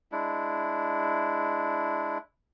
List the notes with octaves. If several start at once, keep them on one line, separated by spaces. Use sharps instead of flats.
G#3 D4 E4